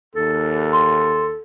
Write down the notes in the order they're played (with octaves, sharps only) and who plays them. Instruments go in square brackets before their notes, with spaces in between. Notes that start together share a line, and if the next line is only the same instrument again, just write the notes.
[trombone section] D#2 [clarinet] A4
[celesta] C6